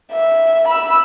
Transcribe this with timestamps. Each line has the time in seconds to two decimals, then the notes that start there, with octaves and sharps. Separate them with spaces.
0.12 E5
0.68 B5 E6